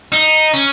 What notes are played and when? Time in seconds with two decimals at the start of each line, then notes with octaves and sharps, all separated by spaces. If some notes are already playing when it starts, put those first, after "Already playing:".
0.12 D#4
0.54 C#4